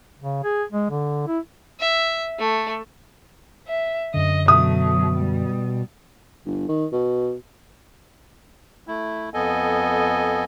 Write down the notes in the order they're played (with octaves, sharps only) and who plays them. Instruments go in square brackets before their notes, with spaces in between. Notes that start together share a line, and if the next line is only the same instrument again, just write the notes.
[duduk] C#3
G#4
G#3
D3
E4
[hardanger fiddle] E5
A3
[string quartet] E5
[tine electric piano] F#2 D3 [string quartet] D#5
[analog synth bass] B2 [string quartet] F#3 A3 [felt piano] D#6
[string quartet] G3
[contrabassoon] G1
D#3
B2
[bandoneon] A3 E4
F2 B3 A4 D#5 G#5